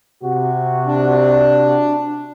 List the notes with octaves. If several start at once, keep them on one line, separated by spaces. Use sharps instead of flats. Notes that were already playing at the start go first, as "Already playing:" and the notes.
C3 F#4
D4